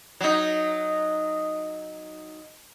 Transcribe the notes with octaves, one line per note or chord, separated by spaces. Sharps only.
F#3 D#4